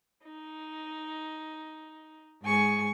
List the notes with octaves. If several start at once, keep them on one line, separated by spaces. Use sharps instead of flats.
D#4
G#2 G#4 G#5 C#6